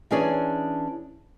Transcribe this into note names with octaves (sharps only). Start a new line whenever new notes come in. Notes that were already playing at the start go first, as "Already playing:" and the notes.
E3 C#4 D4 G#4 C#5 D5